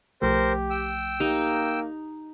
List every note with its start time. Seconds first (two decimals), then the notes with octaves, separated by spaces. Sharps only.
0.22 B1 F3 A3 G4 A#4 C5
0.70 G5 E6
1.20 A#3 D#4 G4